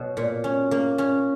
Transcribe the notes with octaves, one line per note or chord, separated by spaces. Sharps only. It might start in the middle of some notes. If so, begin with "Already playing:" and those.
Already playing: B2 F#3
A#2
C#4
A#3
C#4